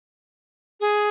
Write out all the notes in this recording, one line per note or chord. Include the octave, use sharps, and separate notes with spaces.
G#4